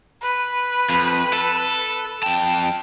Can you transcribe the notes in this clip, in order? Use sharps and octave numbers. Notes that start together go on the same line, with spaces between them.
B4
F2
A4
F2 G5 A5